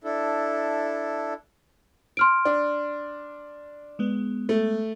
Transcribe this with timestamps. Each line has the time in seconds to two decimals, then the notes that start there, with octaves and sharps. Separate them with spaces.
0.04 D4 E4 A4
2.17 C6 F6 D7
2.45 D4
3.99 G#3 B3
4.49 A3